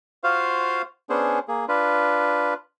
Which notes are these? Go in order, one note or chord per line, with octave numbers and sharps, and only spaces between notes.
F4 F#4 C5 F5
B3 C#4 D4 G#4 C5
A#3 G#4
D4 F4 B4